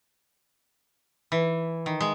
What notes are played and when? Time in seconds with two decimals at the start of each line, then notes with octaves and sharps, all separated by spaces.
1.32 E3
1.86 D#3
2.01 G#3